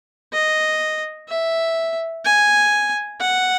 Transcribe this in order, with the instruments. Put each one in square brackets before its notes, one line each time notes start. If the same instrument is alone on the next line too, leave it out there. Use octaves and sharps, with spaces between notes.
[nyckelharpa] D#5
E5
G#5
F#5